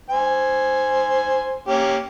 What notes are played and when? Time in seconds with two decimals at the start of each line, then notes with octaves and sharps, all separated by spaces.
0.10 C5 G#5
1.68 A#3 C#4 G4